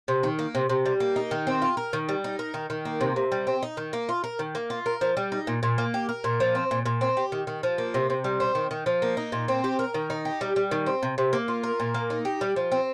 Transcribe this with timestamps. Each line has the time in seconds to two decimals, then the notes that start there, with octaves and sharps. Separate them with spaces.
0.08 C3
0.23 D#3
0.39 A#3
0.55 C3
0.69 C3
0.86 G3
1.00 A#3
1.16 D#4
1.31 D#3
1.47 C4
1.62 F4
1.77 A#4
1.93 D#3
2.09 G3
2.24 D#4
2.39 A#4
2.54 D#3
2.70 D#3
2.85 A#3
3.01 C3
3.16 C3
3.32 G3
3.47 C4
3.63 D#4
3.77 D#3
3.93 A#3
4.09 F4
4.24 A#4
4.39 D#3
4.55 A#3
4.70 F4
4.86 A#4
5.01 F3
5.17 G3
5.32 D#4
5.47 A#2
5.63 A#2
5.78 A#3
5.94 G4
6.09 A#4
6.24 A#2
6.40 F3
6.55 C4
6.71 A#2
6.86 A#2
7.01 C4
7.17 G4
7.32 D#3
7.47 D#3
7.63 F3
7.78 A#3
7.94 C3
8.10 C3
8.24 G3
8.40 C4
8.55 D#3
8.71 D#3
8.86 F3
9.02 A#3
9.17 D#4
9.32 A#2
9.48 C4
9.64 G4
9.79 A#4
9.94 D#3
10.10 D#4
10.25 G4
10.41 G3
10.56 G3
10.71 D#3
10.86 C4
11.03 C3
11.18 C3
11.33 A#3
11.48 F4
11.64 A#4
11.80 A#2
11.94 A#3
12.10 D#4
12.25 G4
12.41 G3
12.56 F3
12.72 C4